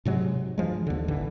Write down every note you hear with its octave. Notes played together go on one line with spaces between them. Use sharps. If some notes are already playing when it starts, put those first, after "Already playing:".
G#2 C3 F#3 G#3
G2 E3 F3 G#3
D#2 D3
A1 D3 E3